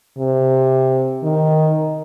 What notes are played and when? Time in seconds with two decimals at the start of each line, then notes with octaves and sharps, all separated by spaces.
0.17 C3
1.23 D#3